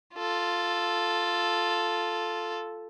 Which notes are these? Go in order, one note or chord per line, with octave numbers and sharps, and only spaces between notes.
F4 A4